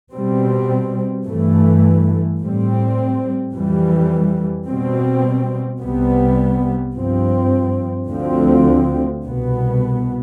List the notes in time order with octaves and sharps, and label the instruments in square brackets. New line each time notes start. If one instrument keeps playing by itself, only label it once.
[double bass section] B2 G3 C4
G2 E3 A3
A2 G3 C4
F2 E3 G3
B2 G3 C4
C2 C3 G3 B3
G2 F3 C4
D2 D3 F3 C4
C2 B2 B3